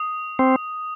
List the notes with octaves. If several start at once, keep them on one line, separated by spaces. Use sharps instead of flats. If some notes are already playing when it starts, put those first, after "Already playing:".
Already playing: D#6
C4